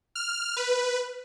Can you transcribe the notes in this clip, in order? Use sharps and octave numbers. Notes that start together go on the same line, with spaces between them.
F6
B4